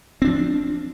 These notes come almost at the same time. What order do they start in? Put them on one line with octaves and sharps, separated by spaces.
C4 D4 F3